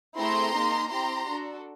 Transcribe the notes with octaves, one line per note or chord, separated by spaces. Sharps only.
A3 C4 E4 G#4 A#5 C6
A#3 D#4 G#4
C4 E4 G4 A#5 C6
D4 F#4 A4